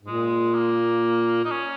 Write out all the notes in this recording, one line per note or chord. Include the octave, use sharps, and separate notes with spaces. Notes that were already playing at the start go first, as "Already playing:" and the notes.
G#2
A#2 G#3
A#3
D#4
C#4